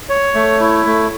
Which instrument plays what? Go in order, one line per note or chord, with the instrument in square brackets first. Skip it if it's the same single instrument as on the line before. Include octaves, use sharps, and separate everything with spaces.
[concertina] C#5
A3
E4
A3